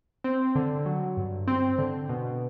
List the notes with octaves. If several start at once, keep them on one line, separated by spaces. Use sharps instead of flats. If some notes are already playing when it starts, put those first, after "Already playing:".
C4
D3
F#3
G2
C4
D3
B2